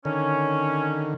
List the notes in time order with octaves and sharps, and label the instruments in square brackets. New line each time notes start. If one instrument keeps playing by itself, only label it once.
[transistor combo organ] D3 D#3 [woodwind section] C#4